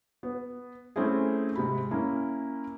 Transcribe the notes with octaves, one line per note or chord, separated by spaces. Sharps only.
B3
A3 C4 C#4 E4 G#4
G#2 C3 B5
A#3 C#4 E4